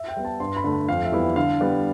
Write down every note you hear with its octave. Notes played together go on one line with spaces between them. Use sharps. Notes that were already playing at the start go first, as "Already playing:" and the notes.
Already playing: E5
G5
G3 B3
A5
G2 C6
B5
D3 A3
B5
F2 F5
E5
E3 G3 B3 E4
D3 F5
G3 B3